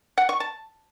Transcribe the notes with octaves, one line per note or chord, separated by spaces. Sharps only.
F#5
C#6
A5